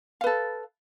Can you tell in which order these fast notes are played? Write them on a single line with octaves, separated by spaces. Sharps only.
F5 B4 A4